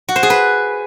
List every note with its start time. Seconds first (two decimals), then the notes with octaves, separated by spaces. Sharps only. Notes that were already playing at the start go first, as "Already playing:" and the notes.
0.09 F#4
0.16 C5
0.23 G#4
0.30 B4